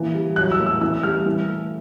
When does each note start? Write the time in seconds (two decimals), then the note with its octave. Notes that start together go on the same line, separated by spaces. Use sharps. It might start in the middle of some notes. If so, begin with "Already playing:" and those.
Already playing: E3 A#3
0.14 G3
0.36 F#3 F#6
0.52 E6
0.59 A3
0.66 E6
0.81 E3 E6
1.03 G3 F6
1.26 E3
1.48 A3